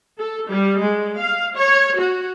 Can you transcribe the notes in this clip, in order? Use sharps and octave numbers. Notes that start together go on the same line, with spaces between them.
A4
G3
G#3
F5
C#5
F#4